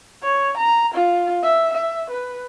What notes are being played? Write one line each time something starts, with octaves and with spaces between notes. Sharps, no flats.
C#5
A#5
F4
E5
E5
B4